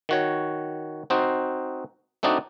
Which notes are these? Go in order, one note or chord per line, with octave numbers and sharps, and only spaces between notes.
D#3 F#4 C#5
C4 D#4 F#4 C5
A3 C4 D4 D#4 F#4 D5